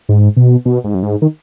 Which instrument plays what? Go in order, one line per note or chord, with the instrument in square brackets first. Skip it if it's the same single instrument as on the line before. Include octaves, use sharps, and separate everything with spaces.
[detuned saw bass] G#2
B2
B2
G#2
F#2
G#2
D#3